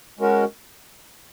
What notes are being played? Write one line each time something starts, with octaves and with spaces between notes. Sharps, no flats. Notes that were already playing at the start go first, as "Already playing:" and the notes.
G#3 C#4 F#4 A#4